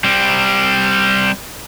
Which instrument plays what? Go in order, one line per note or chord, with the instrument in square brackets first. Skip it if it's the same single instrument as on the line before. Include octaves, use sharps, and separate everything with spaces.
[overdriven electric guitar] G3 C4